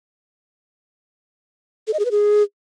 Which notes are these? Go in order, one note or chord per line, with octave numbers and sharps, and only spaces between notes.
A4
D#5
G#4
B4
G#4